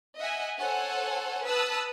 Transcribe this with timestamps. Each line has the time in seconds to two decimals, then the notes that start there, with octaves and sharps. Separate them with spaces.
0.19 D#5 E5 F#5 G#5
0.57 A4 C5 C#5 F#5 G#5
1.45 B4 A5 D#6 E6 F#6